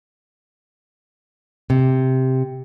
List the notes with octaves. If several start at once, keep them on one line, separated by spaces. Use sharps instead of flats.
C3